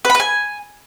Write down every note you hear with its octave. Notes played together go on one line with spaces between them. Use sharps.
B4
B5
B4
G#5